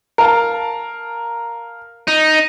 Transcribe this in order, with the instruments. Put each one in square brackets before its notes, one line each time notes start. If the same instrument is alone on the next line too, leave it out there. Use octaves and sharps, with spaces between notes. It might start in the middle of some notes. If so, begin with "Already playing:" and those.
[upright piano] A#4 F5 A5
[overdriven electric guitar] D#4